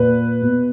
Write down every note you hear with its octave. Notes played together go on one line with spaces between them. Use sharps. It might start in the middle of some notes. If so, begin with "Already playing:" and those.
Already playing: A#2 B4
B2